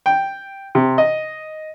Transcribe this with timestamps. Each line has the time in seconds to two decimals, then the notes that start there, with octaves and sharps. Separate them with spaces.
0.06 G5
0.75 C3
0.98 D#5